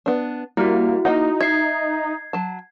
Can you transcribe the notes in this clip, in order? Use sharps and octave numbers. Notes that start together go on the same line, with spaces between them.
B3 D4
G3 A#3 E4 F#4
A#3 D#4 D#5 F#5
E5 G#6 C7
F#3 A5